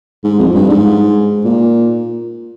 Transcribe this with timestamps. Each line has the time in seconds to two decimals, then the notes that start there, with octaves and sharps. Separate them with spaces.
0.24 G#2
0.39 F2
0.55 G2
0.69 G#2
1.45 A#2